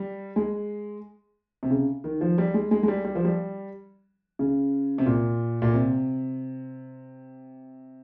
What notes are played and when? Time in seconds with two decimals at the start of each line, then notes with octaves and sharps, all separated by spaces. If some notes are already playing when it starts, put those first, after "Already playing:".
Already playing: G3
0.36 G#3
1.63 C3
1.70 C#3
2.04 D#3
2.21 F3
2.38 G3
2.54 G#3
2.71 G#3
2.83 G#3
2.88 G3
3.05 G3
3.15 F3
3.25 G3
4.39 C#3
4.98 C3
5.06 A#2
5.62 A#2
5.74 C3